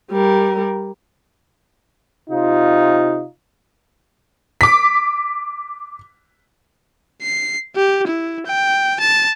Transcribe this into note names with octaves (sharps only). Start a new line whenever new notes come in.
G3 A#4
C3 D#4 F4
D6 B6
C7
G4
E4
G5
A5